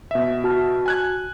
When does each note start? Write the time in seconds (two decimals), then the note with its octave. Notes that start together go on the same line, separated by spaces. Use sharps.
0.11 B2 E5
0.44 F#4 A5 F6
0.86 G#5 F#6 G#6